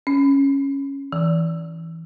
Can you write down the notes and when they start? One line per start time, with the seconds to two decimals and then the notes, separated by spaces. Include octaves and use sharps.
0.07 C#4
1.12 E3